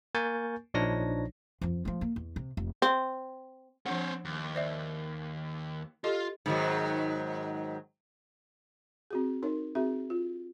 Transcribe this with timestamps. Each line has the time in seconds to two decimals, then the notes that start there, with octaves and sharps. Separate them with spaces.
0.15 A#3 A#4 G#5 C#6 G6 A6
0.74 A#1 F3 D4 D#4 C#5 A#6
1.61 F2 F3
1.85 F3 A3
2.01 A#3
2.16 E2
2.36 C3
2.57 F1
2.82 C4
3.86 F3 C4 D4 C#5 F#5
4.25 D#2
4.55 C5 D5 E5
6.04 F4 G4 A4 D#5
6.46 G#2 D#3 F#3
9.11 C4 F#4 G#4
9.43 D#4 A#4 C#5
9.75 C4 F#4 G#4 E5
10.10 F4